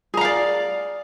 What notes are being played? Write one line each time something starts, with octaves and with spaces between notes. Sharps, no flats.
G#4 D5 F5 A#5